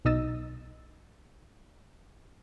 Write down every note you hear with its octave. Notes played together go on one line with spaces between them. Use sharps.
B1 B2 D#4 D#5 E6 A6